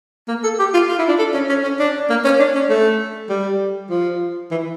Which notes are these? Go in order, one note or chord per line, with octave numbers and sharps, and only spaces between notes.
A#3
A4
G4
F4
F4
E4
D4
A4
C#4
C#4
C#4
D4
A#3
C#4
D4
C#4
A3
G3
F3
E3